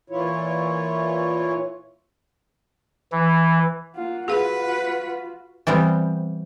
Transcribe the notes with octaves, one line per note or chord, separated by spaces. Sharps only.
A#2 E3 E4 F4 C#5
E3
A#3 F4 F#5
F4 F#4 G#4 B4 F5
E3 G3 B3 C4